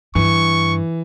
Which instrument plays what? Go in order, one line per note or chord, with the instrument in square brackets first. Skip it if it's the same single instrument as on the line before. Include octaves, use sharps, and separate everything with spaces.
[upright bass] G2 [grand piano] E3 [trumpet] C#6